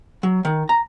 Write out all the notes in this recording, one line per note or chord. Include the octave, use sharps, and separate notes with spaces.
F#3
D#3
A#5